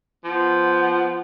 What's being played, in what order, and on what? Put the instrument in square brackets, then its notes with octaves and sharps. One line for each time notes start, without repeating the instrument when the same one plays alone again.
[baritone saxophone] F3 [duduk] B3